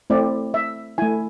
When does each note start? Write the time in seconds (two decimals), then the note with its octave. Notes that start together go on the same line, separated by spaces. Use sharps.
0.10 A3 C4 E4 D5
0.54 E5
0.98 A3 E4 G#5